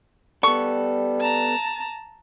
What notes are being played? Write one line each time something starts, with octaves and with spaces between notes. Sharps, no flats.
G3 B3 A4 C#6
A5 A#5